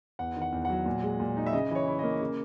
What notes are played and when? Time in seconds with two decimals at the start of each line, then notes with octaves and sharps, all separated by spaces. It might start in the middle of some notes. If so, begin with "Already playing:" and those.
0.19 E2 F#5
0.36 D#3
0.41 F#5
0.52 E2
0.65 F#5
0.70 F#3
0.86 A#2
1.03 G#3
1.20 A#2
1.37 D#4
1.46 E5
1.53 C#3 D#5
1.71 E3 C#5
1.88 E4
1.99 A#3 D#5
2.21 C#3